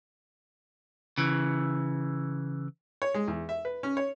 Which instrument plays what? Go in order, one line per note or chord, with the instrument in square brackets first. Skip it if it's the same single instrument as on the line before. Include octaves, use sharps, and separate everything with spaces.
[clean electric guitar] C#3 E3
[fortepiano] C#5
G#3
E2
E5
B4
C#4
C#5